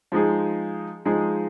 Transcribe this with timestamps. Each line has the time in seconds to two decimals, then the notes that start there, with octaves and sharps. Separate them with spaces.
0.12 F3 G#3 D#4 G#4
1.05 F3 G#3 D#4 G#4